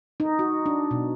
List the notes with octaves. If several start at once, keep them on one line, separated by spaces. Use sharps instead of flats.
D#4
F#4
D4
B2